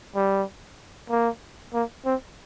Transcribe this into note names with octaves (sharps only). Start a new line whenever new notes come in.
G3
A#3
A#3
C4